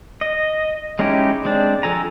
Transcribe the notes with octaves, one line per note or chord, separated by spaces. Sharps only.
D#5
G#3 C#4 D#4 E4 G4
G#3 C4 D4
F3 A4 G#5 A#5